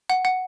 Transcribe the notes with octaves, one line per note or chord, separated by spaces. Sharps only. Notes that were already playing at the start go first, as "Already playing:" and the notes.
F#5
F#5